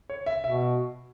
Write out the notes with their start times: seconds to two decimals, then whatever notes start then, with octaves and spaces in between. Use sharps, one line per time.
0.10 C#5
0.26 E5
0.44 B2 E5